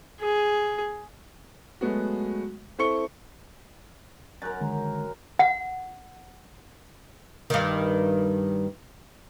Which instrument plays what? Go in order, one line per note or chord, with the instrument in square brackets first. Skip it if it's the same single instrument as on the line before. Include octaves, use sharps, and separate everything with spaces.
[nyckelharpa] G#4
[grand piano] F#3 G#3 A3 B3 F#4
C4 E4 A4 C#6 C#7 G7
[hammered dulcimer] F#2 A#4 [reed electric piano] A#5 F#6 A6
[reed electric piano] D3 D#3 G#3
[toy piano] F#5
[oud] G2 D#3